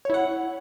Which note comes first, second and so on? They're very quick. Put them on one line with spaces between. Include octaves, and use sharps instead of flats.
C#5 E4 F#5